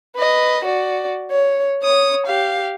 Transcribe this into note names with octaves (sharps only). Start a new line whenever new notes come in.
B4 D#5
F#4 D5
C#5
C#5 D#6
G4 F5